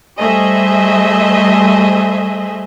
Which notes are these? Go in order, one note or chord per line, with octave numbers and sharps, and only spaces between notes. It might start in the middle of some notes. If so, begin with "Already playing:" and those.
G3 A3 G#4 C5 D#5 E5